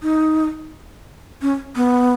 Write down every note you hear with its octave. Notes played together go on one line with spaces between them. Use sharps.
D#4
C#4
B3